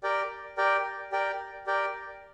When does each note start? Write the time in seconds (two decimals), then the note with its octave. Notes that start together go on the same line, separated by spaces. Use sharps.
0.03 G4 A#4 D5 G5
0.57 G4 A#4 D5 G5
1.12 G4 A#4 D5 G5
1.67 G4 A#4 D5 G5